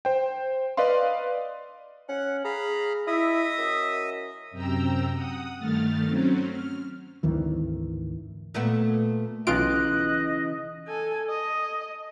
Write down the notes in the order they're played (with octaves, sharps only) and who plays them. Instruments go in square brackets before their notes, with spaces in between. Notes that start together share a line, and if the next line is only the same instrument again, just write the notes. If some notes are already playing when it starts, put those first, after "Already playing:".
[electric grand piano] C5 G5
B4 D5 D#5 F5 C6
[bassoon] C#4 [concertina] F#5 F#6
[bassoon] G#4 [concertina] F5 A#5 B5
[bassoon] E4 [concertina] D#5 E5 D#6
[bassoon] F#2
[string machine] F#2 C3 G5 A#5 E6
F#5 D#6
G2 D#3 A3 F6 A6
F#3 C4 C#4
F6
[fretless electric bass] G#1 D2 D#3 E3
[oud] A#2 A3 B3
[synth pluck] B1 F4 D7 [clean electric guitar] C#3 E3 [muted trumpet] D#5 [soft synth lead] F#6
[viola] A4 G#5
D#5